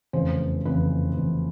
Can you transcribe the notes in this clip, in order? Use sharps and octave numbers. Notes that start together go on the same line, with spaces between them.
F1 E2 C#3 C5
F1 E2 C#3 B4
F1 E2 C#3